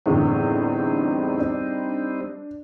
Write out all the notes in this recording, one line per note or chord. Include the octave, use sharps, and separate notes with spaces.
E2 A2 D3 G3 C4 D#4
D4